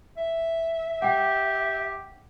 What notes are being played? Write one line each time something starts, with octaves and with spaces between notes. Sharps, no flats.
E5
G4 F#5 G5